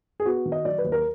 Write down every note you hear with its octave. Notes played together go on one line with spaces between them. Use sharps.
G#4
B3 F#4
D#3
D#5
F#3 D5
B4
D#2
A#4